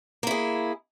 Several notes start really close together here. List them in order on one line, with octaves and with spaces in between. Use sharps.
A#3 E4 G#4